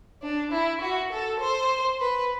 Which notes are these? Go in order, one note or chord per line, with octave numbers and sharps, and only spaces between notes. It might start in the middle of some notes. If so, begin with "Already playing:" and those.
D4
E4
F#4
A4
C5
B4